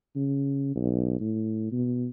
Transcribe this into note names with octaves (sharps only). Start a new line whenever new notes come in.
C#3
B1
A2
B2